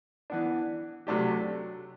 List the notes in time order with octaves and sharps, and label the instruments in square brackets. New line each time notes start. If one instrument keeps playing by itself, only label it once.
[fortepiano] E3 B3 D4
C3 F#3 A3 D4 G4